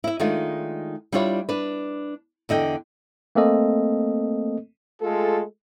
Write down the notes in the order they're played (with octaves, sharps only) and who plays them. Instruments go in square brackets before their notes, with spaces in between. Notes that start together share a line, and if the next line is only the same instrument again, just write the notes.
[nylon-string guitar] E4 E5
D#3 G#3 A3 D4 D#4 F4
G3 D4 E4 F4 C#5
D4 B4
E2 D3 D#5 G5
[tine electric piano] A3 A#3 C4 A4 D#5
[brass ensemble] G#3 A3 F4 G#4 A4